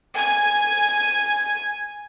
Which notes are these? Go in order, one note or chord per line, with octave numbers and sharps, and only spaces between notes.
G#5 G#6